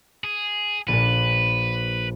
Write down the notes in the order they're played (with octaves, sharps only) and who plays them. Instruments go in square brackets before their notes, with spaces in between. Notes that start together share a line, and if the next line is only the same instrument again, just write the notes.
[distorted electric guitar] G#4
[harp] A#1 A#2 [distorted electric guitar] B4